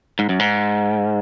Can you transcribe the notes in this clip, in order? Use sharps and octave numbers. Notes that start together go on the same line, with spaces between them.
G#2
F#2
G#2